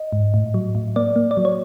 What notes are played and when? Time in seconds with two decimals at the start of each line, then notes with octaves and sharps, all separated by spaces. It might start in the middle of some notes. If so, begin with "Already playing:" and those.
Already playing: D#5
0.12 G#2
0.34 A2
0.54 F#3
0.75 A2
0.96 A#3 D5
1.16 A#3
1.31 D5
1.37 F#3
1.45 C#5